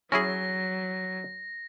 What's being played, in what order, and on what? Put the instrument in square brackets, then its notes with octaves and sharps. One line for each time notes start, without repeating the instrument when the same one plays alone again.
[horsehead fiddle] F#3 [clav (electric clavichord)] C#4 E4 G#4 [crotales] A#6